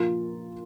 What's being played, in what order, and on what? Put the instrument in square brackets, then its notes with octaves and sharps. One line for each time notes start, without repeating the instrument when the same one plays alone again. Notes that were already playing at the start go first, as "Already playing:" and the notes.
Already playing: [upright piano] A#2 F3 A#3 F4 A#4